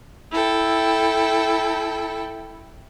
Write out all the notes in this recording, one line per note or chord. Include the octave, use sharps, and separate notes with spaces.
E4 A4 G5